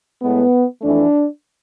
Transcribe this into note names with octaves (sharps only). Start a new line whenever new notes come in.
A2 G#3 B3
F2 E3 A3 D4